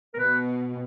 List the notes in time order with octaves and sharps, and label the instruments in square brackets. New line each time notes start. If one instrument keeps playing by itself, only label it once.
[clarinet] A#4
[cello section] B2 [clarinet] B4